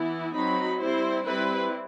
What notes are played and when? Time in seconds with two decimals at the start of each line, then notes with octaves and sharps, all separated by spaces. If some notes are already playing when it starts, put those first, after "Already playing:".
Already playing: E3 B3 E4
0.35 F#3 C4 D#4 B5
0.80 G3 C4 E4 C5
1.26 G3 C4 E4 B4